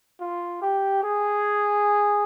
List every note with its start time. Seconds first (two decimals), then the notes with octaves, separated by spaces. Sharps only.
0.20 F4
0.62 G4
1.03 G#4